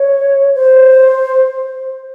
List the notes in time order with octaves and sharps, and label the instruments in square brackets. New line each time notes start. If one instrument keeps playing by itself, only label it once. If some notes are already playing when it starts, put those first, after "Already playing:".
Already playing: [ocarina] C#5
C5